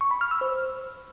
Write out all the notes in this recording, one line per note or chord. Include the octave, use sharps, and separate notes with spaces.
C#6
B5
F6
E6
C5